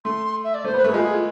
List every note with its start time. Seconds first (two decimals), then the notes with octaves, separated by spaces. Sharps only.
0.05 A3 C6
0.44 E5
0.54 D5
0.64 A3 C5
0.74 B3
0.79 B4
0.84 A3
0.88 G#4
0.94 G#3 F4
1.04 G#4
1.14 F4